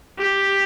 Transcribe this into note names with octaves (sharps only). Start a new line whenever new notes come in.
G4